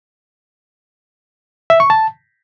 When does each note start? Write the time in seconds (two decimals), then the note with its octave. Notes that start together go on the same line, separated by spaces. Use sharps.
1.70 E5
1.80 C#6
1.90 A5